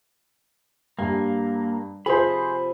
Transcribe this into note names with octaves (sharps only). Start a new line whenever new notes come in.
G2 A#3 G#5
C3 F3 G#4 A4 C5 E5 B5